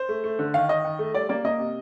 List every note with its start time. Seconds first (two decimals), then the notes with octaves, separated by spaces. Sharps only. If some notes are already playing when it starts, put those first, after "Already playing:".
Already playing: C5
0.09 A3
0.24 A3
0.39 D3
0.54 D#3 F5
0.69 D#3 D#5
0.84 D#3
0.99 A3
1.14 G3 D5
1.29 A#3 D5
1.45 A#3 D#5
1.59 C3